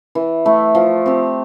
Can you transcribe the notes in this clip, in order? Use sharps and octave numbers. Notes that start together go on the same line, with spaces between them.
E3
A3 E4
F3
C4 G4